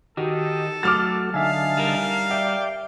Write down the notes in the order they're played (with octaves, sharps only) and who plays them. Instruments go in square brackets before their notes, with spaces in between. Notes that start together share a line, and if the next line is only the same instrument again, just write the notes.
[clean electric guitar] D#3 [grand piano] F#4 [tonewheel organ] G4 D#5 [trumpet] A4
[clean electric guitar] F#3 [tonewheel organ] A3 F#4 [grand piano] D6 F6 A6
[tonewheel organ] D3 D#4 A5 [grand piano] E5 G#5 [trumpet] F5
[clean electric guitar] G3 A#4
[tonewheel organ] D5 G5 [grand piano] E5